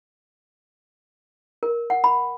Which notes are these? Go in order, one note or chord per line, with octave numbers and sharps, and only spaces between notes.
A#4
F#5
B5